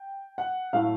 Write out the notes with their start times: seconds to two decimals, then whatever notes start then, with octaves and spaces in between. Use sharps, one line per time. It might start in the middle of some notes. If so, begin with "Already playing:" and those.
Already playing: G5
0.38 F#5
0.73 A2 F#3 A3 F5